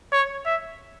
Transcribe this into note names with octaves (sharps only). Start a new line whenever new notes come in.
C#5
E5